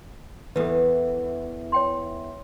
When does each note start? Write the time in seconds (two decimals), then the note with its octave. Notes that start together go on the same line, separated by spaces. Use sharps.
0.56 E2 E3 A4 B4
1.72 C#5 G5 C6